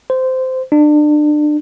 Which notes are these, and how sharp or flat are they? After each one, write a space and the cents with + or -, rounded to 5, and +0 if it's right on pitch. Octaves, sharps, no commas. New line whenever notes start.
C5 -15
D4 +30